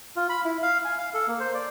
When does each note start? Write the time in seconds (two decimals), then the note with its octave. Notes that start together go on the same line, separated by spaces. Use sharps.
0.16 F4
0.29 B5
0.45 E4
0.63 F5
0.85 G#5
0.98 F5
1.14 A4
1.28 A#3
1.40 C5
1.54 D5